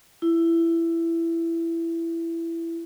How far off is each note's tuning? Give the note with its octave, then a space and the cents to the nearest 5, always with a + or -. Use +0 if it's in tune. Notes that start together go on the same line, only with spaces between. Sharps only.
E4 +15